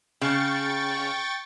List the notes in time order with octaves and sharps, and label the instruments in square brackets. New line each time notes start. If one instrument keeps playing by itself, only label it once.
[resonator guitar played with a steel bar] C#3 [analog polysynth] G5 C#6 A6